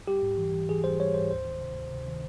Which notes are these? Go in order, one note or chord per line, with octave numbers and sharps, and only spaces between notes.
G3 G4
G#2
E3
E3
E3 G#4
G3 C5
G3 C#5
G#2 C5
D2 C5
D#3
C3
D2
C3
D#3